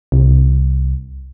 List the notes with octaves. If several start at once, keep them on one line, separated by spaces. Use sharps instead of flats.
C2